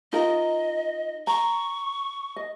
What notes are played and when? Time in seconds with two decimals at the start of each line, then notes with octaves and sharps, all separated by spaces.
0.13 D#4 F4 A#4 D#5
1.27 A#5 C#6
2.36 D#5